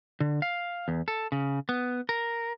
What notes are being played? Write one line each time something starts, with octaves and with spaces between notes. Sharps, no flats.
D3
F5
E2
A4
C#3
B3
A#4